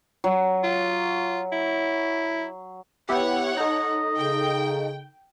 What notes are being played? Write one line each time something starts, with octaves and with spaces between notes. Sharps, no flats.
F#3
F4
E4
B3 E4 G4 C#5 F#5
D#4 A4 D#5
C#3 G5